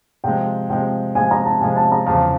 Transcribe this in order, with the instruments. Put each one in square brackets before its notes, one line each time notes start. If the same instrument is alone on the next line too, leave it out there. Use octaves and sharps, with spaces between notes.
[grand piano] C3 F3 G#3 [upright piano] G5
[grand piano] C3 F3 G#3 [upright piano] G5
[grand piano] C3 F3 G#3 [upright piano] G#5
[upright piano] A#5
A5
[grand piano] C3 F3 G#3 [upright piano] G#5
[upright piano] A5
A#5
[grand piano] E2 C#3 F3 [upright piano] A5